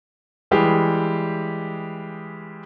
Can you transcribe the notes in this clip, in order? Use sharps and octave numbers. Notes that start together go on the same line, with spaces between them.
E3 G3 G#3 G4 G#4